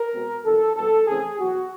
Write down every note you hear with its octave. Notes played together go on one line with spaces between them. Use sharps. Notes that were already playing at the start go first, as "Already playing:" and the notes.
Already playing: A#4
B2 G#3 C4
F2 C3 D#3 A4
E2 B2 G3 B3 A4
C#3 E3 A3 C4 G#4
E2 B2 F#3 F#4